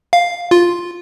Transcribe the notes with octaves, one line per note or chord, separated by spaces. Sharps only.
F5
F4